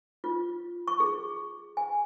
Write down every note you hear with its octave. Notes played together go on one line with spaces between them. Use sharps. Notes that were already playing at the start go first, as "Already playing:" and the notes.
F4
C#6
G#4
G#5